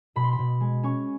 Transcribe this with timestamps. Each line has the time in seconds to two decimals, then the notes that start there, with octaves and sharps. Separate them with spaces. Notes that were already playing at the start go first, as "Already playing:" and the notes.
0.16 B2 B5
0.23 C6
0.33 B5
0.39 B2
0.61 G#3
0.83 C#4 C#6